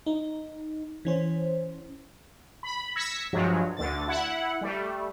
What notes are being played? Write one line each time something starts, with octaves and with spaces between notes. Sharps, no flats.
D#4
E3 C#4 C5
B5
E6 G#6 A#6 B6 C#7
G2 F3 F#3 G#3
D2 D3 A6
E4 F#5
G3 A3